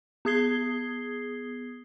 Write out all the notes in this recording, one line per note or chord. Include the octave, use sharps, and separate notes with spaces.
B3 G#4 D#6 G#6 C7 G7